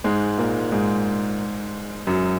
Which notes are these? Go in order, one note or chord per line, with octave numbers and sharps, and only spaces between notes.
G#2 G#3
A#2 A#3
G#2 G#3
F#2 F#3